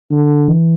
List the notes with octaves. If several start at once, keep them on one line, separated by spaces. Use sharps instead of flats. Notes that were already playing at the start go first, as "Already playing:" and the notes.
D3
E3